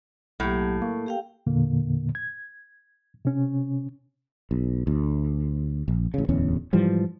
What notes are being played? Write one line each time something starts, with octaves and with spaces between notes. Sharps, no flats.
B1 A2 F#3 A#3 G4
A#3 C#6
G4 F5 G5
E2 A#2 D3 A#3
G#6
C3 C#4
B1
D2
A#1
A1 C#3
D1 E2 C#4
G#2 E3 F3 G3